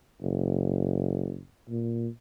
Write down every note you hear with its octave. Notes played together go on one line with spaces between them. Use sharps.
F#1
A#2